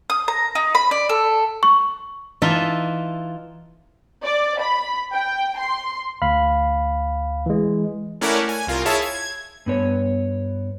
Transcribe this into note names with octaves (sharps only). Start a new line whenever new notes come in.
D#6
A#5
D#4
B5
D5
A4
C#6
E3 D#4 F4 E5 A5
D5
B5
G5
C6
D2 F5 B5
E3 G#3
A3 C#4 E4 A#4 D5 F#5
G#5
C2 F4 A#4
E4 G#4 C#5 E5 F5 A5
G#6
G2 B3 C#5